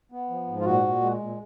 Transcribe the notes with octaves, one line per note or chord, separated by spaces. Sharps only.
B3
F3
G#2
F4
A#2 F#4
A#2
G#3
A#2